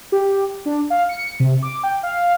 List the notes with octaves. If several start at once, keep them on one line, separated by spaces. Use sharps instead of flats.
G4
D4
F5
C#7
C3
D6
G5
F5